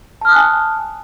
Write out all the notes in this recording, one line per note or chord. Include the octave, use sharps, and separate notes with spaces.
G#5 A5 D#6 F6 F#6